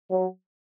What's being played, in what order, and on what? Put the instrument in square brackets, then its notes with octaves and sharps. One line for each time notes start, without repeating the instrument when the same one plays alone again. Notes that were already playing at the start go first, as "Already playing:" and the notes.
[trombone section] F#3